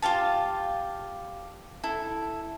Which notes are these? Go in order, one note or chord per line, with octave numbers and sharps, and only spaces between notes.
F4 G4 F5 A5
E4 A4